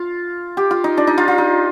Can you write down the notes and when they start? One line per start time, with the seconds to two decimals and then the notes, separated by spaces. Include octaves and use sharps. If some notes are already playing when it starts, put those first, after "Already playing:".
Already playing: F4
0.57 G4
0.71 F4
0.84 D#4
0.97 D4
1.07 D#4
1.18 F4
1.28 F4
1.38 D#4